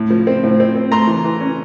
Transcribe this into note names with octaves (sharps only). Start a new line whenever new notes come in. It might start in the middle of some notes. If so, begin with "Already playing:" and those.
Already playing: A2
F3
C4
A2
C4
C4
A3 A#5 C6
E3
E3
C#4